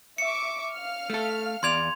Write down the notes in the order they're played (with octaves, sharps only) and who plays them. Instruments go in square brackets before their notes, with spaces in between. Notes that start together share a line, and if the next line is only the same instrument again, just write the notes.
[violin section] E5 C#6 D6 [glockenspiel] C#7
[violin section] F5 F6
[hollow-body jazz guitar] A3 A4
[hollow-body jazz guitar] E2 D5 [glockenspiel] C6 G#6 F7